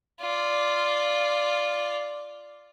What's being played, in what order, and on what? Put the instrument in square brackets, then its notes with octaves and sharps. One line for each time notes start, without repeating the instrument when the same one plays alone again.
[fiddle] F4 D5